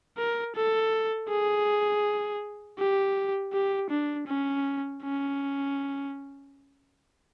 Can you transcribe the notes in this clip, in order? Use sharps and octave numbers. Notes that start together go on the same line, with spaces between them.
A#4
A4
G#4
G4
G4
D4
C#4
C#4